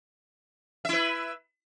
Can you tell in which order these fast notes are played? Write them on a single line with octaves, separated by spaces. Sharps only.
E5 E4 B4